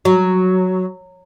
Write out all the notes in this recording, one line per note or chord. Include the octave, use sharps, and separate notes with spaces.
F#3